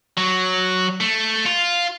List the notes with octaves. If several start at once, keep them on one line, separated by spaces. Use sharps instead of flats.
F#3
A3
F4